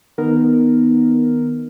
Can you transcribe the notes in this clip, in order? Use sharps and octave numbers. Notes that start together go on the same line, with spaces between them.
D#3 B3 D#4 A#4